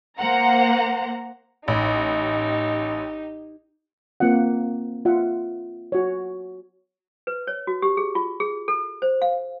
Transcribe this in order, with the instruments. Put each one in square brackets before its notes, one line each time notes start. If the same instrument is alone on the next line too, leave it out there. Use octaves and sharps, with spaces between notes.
[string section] A#3 C5 F#5 A#5
[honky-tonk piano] A1 [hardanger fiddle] D#4 G4
[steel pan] A#3 C4 F4 F#5
F4 E5 F#5
F#4 C#5
[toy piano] B4
C#5
F#4
G4
G#4
F4
G#4
A4
C5
F5